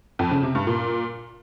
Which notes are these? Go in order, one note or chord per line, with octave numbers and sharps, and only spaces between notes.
F2
C#3
C3
G2
A#2